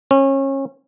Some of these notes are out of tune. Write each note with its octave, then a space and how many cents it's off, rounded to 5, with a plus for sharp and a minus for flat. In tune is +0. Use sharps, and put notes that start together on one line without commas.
C#4 -30